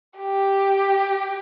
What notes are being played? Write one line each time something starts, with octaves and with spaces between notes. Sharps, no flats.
G4